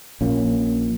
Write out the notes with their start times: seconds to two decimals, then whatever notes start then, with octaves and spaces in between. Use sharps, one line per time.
0.21 A#1 A#2 A#3 C#4